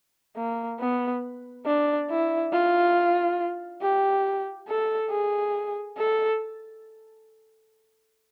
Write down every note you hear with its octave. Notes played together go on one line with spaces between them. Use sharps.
A#3
B3
D4
E4
F4
G4
A4
G#4
A4